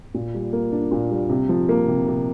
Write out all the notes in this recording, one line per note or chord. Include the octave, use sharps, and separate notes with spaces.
A#2
G3
A#3
D4
A#2
G3
C3
F3
A#3
C3
C3